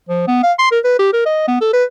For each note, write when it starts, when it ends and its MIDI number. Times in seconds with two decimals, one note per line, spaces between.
0.09 0.27 53
0.27 0.42 59
0.43 0.53 77
0.59 0.70 84
0.71 0.79 70
0.84 0.97 71
0.99 1.08 67
1.13 1.24 70
1.26 1.48 75
1.48 1.57 59
1.61 1.72 69
1.73 1.84 71